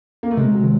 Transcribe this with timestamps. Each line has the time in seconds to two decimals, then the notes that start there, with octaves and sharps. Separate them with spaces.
0.23 A#3
0.31 A3
0.37 C3 G#3
0.54 F#3
0.63 D#3 G#3